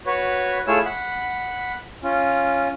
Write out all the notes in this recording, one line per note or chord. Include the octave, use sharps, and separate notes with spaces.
F#4 B4 C#5
A3 E4 F4 G#4 C#5 E6
F#5 B5
C#4 F4